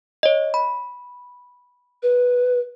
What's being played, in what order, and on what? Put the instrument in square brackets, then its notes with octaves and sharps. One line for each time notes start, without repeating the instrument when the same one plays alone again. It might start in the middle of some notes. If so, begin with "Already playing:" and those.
[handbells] C#5 D#5
B5
[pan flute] B4